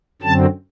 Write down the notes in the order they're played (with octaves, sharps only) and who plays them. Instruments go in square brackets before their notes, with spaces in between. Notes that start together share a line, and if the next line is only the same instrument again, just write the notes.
[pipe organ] F#2 D3 F#3 C4 A5